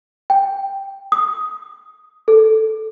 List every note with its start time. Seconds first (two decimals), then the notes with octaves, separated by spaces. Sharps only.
0.30 G5
1.12 D#6
2.28 A4